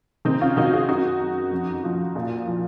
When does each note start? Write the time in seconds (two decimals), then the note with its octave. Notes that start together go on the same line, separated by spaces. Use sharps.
0.25 D#3 C4 D#4
0.41 C#4 F4
0.57 D#3 D#4 F#4
0.73 F4 G#4
0.88 F#2 D#4 F#4
1.20 F#2
1.51 F2
1.84 F3
2.15 A#2
2.47 F3